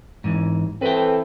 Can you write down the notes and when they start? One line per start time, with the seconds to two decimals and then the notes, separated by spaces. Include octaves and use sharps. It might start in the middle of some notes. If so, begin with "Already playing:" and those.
0.24 G#2 E3
0.82 E3 C4 A4 B4 G5